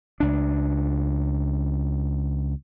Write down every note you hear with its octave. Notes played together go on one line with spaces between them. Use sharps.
C#2 D4